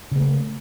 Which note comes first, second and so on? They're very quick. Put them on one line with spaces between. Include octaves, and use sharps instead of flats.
C#3 A#3 A3